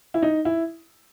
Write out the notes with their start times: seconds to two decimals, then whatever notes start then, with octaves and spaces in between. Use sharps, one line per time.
0.14 E4
0.22 D#4
0.45 E4